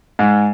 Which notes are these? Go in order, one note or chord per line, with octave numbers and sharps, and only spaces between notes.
G#2